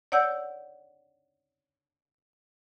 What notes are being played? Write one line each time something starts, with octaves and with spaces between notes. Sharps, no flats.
C#5 D5 F#5 E6 G6